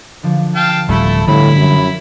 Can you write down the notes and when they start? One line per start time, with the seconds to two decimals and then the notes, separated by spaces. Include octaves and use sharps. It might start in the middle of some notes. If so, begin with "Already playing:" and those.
0.23 D3 F3 D4
0.55 F5 G5 A5
0.89 D1 G3 A3 E4 F4 A4
1.28 A2 D3 G3 E4 B5
1.56 F#2